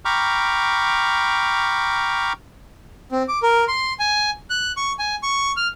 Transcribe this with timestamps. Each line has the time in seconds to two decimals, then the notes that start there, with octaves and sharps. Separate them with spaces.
0.05 G5 A#5 B5 C#6 D6 F6
3.12 C4
3.28 D6
3.43 A#4
3.68 C6
3.99 G#5
4.50 F#6
4.77 C#6
4.99 G#5
5.23 C#6
5.57 F6